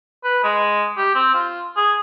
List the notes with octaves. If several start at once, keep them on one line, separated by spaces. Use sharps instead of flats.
B4
G#3
G4
C4
F4
G#4